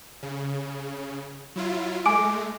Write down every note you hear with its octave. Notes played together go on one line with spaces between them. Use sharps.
C#3
F#3 E4 F4
G#3 A3 G#5 D6 D7